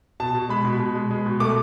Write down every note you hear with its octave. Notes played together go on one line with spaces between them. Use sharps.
B2 A5
B2
G#3 B5
B2
B2
G#3
G#3
B2
A3 D6